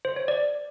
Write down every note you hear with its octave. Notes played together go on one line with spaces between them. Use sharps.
C5
C#5
D5